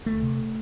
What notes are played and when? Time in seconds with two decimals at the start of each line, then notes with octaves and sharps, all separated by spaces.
0.06 D2 A3
0.22 C3